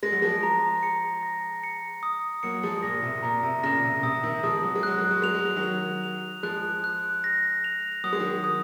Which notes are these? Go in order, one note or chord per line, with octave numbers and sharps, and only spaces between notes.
G#3 A#6
F#3
F3 G#3
A#5
C#7
A#6
C#7
D#6
F#3 A#3 C#7
F3 G#3
A#2 A#6
C3
A#2 A#5
C3
A#2 C#3 A#6
C3
C3 D#6
C3 D#3
F3 G#3 D#6
F#3
G#3
F#3 F#6
G#3
F#3
G#3 F7
F#3
G#3
D#3 F#3
F7
F7
F3 G#3 F#6
F#6
A#6
F7
F#3 D#6
G#3
D#3 F#3
D#6